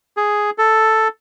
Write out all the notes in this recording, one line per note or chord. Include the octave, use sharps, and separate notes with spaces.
G#4
A4